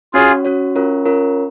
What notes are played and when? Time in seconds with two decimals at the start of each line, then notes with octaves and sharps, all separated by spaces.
0.13 C#4 F4 F#4 G#4 C#5
0.45 C#4 F#4 C#5
0.75 C#4 F4 A#4 C#5
1.06 C#4 F4 A#4 C#5